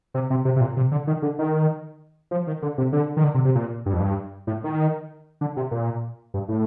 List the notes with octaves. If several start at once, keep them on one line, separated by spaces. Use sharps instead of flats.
C3
C3
C3
C3
A#2
C3
D3
D#3
D3
D#3
F3
D#3
D3
C3
D3
D#3
D3
C3
C3
A#2
G2
F2
G2
A2
D#3
D3
C3
A#2
G2
A2